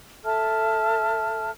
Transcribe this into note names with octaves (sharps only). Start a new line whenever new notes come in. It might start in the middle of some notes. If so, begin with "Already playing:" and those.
A4 E5 A5 F6